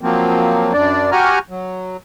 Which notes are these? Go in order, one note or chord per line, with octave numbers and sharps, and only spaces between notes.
F3 F#3 A#3 C4
F#2 D4 D5
F#4 G4 F#5 G#5 A#5 F6
F#3